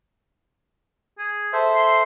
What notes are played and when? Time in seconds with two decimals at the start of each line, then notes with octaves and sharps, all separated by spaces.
1.19 G#4
1.53 A4 C5 E5
1.76 C6